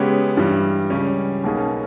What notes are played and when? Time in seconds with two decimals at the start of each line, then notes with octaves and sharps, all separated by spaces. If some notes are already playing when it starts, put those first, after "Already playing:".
Already playing: C#3 G#3 B3 G4 C#5
0.37 G2 E3 G3
0.90 C#2 C#3 G3 C#4
1.43 B1 B2 A#3 C#4 G#4